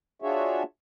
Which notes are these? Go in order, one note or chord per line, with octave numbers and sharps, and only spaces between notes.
D4 F4 F#4 G#4 C#5 E5